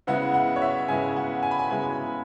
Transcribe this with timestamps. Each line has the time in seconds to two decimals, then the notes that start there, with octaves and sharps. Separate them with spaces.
0.07 C#3 G#3 B3 E4 F#5
0.34 F#5
0.56 C#5
0.62 E5
0.88 C#3 G#3 B3 E4 G#5
1.16 F#5
1.43 G#5
1.51 B5
1.59 G#5
1.70 C#3 G#3 B3 E4 G#5